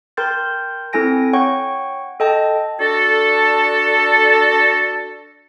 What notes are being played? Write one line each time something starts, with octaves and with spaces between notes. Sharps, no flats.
A#4 G5 C6 G6 A6
C4 E4 A4 G#5 A#6 D7
C#5 F#5 G5 C#6
A4 D#5 G5 A5
D4 F#4 A4